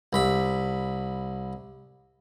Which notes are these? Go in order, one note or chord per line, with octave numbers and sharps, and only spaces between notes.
C2 B5